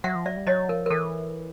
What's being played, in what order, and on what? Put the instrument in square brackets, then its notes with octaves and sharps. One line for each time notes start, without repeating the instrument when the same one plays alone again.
[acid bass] F#3 [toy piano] E5 F#5
[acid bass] F3
[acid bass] F#3 [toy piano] D5 E5
[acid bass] G3
[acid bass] F#3 [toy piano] C#5 D#5
[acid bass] F3 [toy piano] A#4
[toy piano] A#4
[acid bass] E3 [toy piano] A4